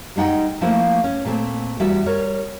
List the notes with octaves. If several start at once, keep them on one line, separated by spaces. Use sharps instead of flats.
G3 G#3 D#4 F#5 G5
F3 A3 A#3 E4 C5
C#4
A#2 A3 C4
E2 G3 E4 F#4 E5
G3 A#4 C#5